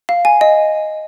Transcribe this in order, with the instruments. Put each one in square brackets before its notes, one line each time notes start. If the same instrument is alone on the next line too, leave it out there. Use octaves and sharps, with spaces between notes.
[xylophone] F5
G#5
D#5